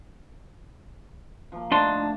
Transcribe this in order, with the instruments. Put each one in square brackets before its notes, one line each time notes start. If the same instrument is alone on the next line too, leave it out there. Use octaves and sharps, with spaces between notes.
[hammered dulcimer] F3 A#3
[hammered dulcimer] D3 A3 [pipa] D4 [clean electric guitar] D#4 C6